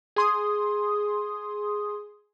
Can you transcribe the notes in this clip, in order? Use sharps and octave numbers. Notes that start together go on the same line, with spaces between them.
G#4 C6 D#6